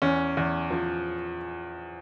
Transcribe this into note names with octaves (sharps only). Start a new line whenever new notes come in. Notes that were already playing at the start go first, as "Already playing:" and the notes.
E2 C#4
E2
F3